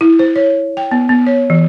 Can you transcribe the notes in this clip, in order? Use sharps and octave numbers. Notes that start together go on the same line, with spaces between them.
E4
C5
C#5
G5
B3
B3
C#5
E3